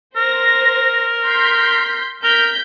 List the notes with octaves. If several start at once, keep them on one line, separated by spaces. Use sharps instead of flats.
A#4 C5 A#6
C6 G6 B6
A#4 G6 B6